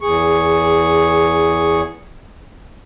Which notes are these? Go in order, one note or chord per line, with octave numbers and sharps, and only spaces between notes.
E2 G#4 C#6